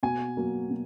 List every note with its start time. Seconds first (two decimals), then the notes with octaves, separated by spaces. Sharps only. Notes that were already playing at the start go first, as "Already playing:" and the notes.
0.03 B2 G#5
0.37 F#3 A#3
0.70 B2